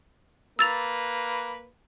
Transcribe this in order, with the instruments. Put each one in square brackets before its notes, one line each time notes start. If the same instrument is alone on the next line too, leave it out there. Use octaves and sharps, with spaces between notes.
[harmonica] A#3 B4 [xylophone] E6 A6 F7